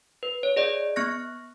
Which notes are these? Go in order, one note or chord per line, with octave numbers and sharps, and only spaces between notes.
B4
C#5
G#4 D5 D#5
B3 C#6 F#6 A#6